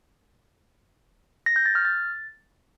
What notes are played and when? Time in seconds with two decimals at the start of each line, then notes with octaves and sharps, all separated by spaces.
1.46 A#6
1.56 G6
1.66 A6
1.75 F6
1.85 A6